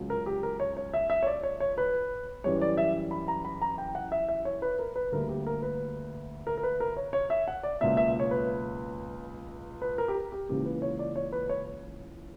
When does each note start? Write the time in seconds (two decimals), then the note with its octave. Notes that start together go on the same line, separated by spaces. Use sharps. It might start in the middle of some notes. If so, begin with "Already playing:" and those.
Already playing: C#2 C#3 F#3
0.10 A#4
0.26 G4
0.43 A#4
0.60 C#5
0.77 C#5
0.94 E5
1.10 E5
1.23 C#5
1.27 D5
1.43 C#5
1.60 C#5
1.78 B4
2.44 F#2 E3 G3 C#5
2.61 D5
2.77 E5
3.11 B5
3.28 A#5
3.45 B5
3.62 A#5
3.78 G5
3.95 F#5
4.12 E5
4.29 E5
4.45 C#5
4.62 B4
4.79 A#4
4.96 B4
5.12 D2 D3 G3 A#3 A#4
5.29 G4
5.47 A#4
5.62 B4
6.47 A#4
6.57 A#4
6.63 B4
6.80 A#4
6.97 C#5
7.13 C#5
7.30 E5
7.48 F#5
7.63 D5
7.81 C#2 B2 F#3 A#3 E5
7.97 E5
8.20 C#5
8.31 B4
9.82 B4
9.98 A#4
10.08 G4
10.15 A#4
10.32 G4
10.49 C#2 C#3 E3 A#3 G4
10.66 B4
10.82 C#5
10.99 D5
11.16 C#5
11.32 B4
11.49 C#5